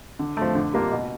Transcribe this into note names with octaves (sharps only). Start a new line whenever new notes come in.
D3
F3 A3
D3
G3 A#3 D4 F4
B2